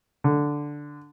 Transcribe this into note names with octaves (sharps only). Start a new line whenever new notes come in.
D3